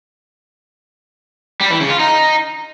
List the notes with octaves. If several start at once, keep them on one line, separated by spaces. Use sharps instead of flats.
G3
E3
C#3
F4
D#4